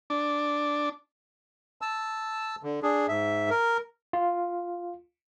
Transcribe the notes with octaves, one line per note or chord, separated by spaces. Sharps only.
D4
A5 E6
D3
D4 G#4
G#2 E5
A#4
F4